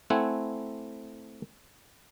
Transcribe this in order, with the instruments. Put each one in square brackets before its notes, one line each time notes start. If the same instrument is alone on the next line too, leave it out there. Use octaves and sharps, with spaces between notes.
[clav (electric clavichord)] A3 C4 E4 F#5 G#5